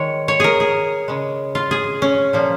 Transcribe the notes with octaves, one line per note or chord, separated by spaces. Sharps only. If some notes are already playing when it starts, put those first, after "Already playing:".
Already playing: D#3 G#3 C#5
C#5
G#4 A#4
G#4
C#3 G#3
F4
G#4
C#4
A#2 F3 A#3